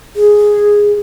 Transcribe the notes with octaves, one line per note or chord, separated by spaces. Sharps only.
G#4